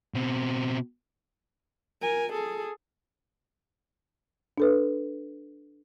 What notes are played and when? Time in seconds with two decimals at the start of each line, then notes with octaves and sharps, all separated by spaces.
0.14 B2 C4
2.02 A#4 G#5
2.32 G#4 A4
4.58 D4 A4 B4